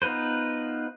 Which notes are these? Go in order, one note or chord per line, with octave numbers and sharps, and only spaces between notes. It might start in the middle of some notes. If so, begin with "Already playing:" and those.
B3 D#4 F4 B4 C5